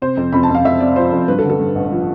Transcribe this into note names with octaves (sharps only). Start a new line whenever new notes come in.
C3 C5
F2
F2 B5
A5
F2
F5
F2 E5
C3 D5
F3 C5
F2
G2 B4
A4
D3
A4
G2
A1
F3